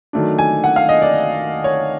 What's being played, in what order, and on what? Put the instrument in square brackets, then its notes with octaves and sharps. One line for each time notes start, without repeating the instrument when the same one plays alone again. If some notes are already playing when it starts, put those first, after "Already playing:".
[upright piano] D#3 F#3 A3 D4
G#5
F#5
F5
D#5
D5
C#5